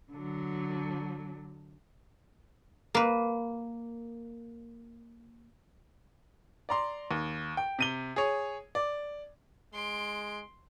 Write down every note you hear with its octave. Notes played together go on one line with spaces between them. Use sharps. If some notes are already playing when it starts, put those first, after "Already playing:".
D3 F#3
A#3 B4
D5 A#5 C6
D#2
G5
C3 D#7 G7
G#4 C#5
D5
G#3 C6 D7